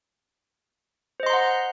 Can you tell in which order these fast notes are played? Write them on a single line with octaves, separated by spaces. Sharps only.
C5 D#5 C6 A#5 F#5